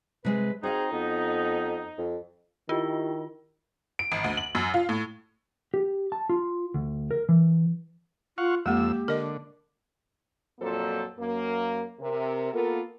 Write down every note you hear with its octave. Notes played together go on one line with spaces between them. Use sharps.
C3 G#3 G#4 B4
C4 D#4 F#4 G#4 F5
F2 B3
F2
D#3 E4 F4 G4
D7
G#1
D2
F#7
F#2
F4
A2
G4
A5
F4
D2
A#4
E3
F4 F5 F#5 C#6
F2 G#3 A#3 G4 E6
D3 A#4 D#5
F2 A#2 F#3 A#3 A4 C5
F#2 A#3
C3 A#4
A#3 B3 F4 A4 A#4